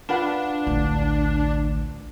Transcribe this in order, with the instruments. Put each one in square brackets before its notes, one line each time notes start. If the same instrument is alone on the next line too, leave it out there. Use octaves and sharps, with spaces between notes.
[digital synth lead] D4 [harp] F4 B4 F#5
[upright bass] A1 D2